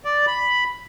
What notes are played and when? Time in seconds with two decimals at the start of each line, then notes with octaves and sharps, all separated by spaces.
0.05 D5
0.27 B5